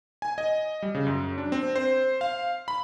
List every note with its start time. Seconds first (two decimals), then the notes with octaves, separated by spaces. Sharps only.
0.22 G#5
0.38 D#5
0.82 G3
0.95 C#3
1.07 F#2
1.38 D4
1.52 C4
1.76 C5
2.21 F5
2.68 B5